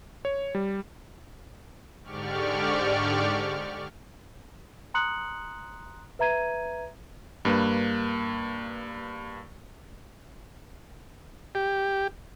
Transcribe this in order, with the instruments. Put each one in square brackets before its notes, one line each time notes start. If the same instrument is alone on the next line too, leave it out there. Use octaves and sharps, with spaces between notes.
[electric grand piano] C#5
G3
[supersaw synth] G#2 D3 G4 D5 C#6 F6
[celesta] A#5 C6 D#6 F#6 C#7 F#7
B4 E5 A#5 G#6 D#7
[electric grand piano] G2 A#3 B4
[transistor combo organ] G4